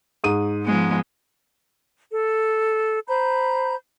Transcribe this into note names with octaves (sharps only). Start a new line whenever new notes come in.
G#2 D#6 D#7
F3 G#3 B3
A4
C5 A#5 B5 G6